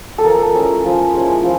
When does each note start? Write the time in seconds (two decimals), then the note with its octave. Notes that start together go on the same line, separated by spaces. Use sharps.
0.18 A4
0.25 F3 A#4
0.54 G#3 C#4 E4
0.84 F3
1.14 G#3 C#4 E4
1.43 F3